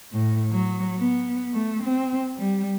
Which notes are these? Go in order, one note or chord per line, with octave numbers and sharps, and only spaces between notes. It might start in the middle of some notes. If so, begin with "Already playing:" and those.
A2
F#3
B3
A3
C4
G3